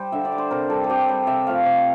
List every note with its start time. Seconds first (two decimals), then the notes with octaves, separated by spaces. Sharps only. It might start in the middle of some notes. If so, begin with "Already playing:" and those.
Already playing: G3 C5
0.12 D3 E5
0.25 D5
0.32 G3
0.38 C5
0.51 C3 A#4
0.70 G3 A4
0.84 A4
0.89 C3 G4
1.09 G3
1.27 C3 E5
1.47 F3 A3 F5
1.65 C3